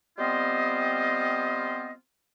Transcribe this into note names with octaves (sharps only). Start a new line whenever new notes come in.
G3 B3 C4 F4 C5 D#5